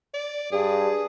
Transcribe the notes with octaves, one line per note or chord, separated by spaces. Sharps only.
D5
G2 G#4